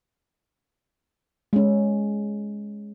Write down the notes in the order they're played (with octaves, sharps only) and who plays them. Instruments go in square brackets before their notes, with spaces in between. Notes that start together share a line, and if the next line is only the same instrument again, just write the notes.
[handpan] G#3 C#4